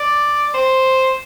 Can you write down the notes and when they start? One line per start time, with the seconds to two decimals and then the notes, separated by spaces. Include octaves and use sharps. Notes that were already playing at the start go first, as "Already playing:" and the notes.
Already playing: D5
0.54 C5